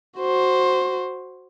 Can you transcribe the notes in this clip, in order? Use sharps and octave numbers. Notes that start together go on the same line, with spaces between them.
F#4 C5